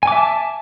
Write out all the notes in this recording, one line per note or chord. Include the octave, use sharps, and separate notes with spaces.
E5 G#5 A5 D6